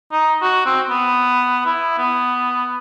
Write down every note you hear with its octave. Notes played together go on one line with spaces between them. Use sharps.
D#4
F#4
C4
B3
E4
B3